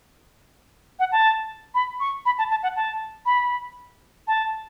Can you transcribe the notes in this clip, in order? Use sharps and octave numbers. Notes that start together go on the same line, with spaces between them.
F#5
A5
B5
C#6
B5
A5
A5
F#5
A5
B5
A5